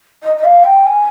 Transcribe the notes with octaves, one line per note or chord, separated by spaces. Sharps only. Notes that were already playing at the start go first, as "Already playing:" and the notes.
D#5
D#5
F5
G5
G#5